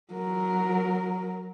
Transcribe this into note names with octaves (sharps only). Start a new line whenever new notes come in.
F#3 A#4